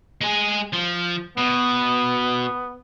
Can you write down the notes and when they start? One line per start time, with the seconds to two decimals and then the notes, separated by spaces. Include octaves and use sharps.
0.21 G#3 G#4
0.73 F3
1.37 B2 B3